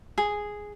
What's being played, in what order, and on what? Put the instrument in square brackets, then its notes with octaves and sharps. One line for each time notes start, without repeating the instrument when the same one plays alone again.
[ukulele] G#4